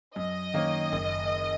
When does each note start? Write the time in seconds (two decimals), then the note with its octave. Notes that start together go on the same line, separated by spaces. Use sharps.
0.16 F#2 D#5
0.54 D#3 A#3 C#4
0.92 F#1